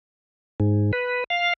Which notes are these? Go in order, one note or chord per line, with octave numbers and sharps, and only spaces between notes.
G#2
B4
F5